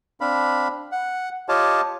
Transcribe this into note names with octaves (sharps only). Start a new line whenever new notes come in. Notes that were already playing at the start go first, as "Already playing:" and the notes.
C4 D4 F5 B5
F#5
F4 G4 C#5 D#5 F5 A5